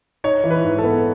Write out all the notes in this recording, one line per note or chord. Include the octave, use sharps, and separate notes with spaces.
D#4 C#5
E3
B4
G#2
A4
B3